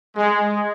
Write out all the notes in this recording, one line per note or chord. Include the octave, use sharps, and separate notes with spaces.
G#3